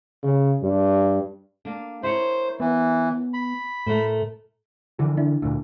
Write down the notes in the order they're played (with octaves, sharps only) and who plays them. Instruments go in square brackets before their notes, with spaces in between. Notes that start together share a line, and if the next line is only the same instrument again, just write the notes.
[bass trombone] C#3
G2
[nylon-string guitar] A#3 D4
[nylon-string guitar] E4 A#4 C#5 [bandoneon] C5
[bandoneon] E3 [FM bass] B3
[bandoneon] B5
[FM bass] A2 [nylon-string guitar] A3 A#4 C5
[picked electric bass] D3 E3 [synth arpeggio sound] F3
[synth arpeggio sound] D4 E4
[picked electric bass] D2 A#2